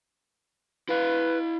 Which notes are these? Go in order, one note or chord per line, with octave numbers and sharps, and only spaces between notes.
E4 B4 F5